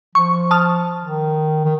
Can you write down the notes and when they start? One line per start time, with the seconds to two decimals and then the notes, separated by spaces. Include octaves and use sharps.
0.15 F3 C#6
0.51 A5 D#6 F6
1.03 D#3
1.65 D#3